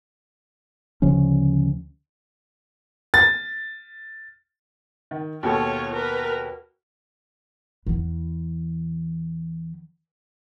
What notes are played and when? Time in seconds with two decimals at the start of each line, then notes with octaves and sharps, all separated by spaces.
1.02 D2 C#3 F3 C#4
3.14 A6
5.11 D#3
5.43 D#2 B2 F4 A4 C#5
5.93 A#4 B4
7.86 E2 E3